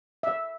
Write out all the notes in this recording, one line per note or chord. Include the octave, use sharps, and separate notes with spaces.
E5